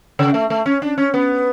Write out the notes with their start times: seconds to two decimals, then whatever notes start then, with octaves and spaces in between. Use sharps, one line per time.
0.19 C#3
0.34 A3
0.50 A3
0.66 C#4
0.82 D4
0.98 C#4
1.14 B3